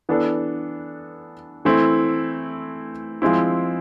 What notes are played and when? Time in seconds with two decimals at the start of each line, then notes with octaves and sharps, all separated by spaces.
0.09 E3 B3 D4 A4
1.65 E3 A3 C4 E4
3.22 F3 G#3 C4 E4